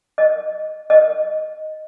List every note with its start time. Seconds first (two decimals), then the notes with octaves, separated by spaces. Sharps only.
0.18 D#5
0.90 D#5